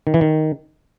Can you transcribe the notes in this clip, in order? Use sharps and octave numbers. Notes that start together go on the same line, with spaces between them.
D#3
E3
D#3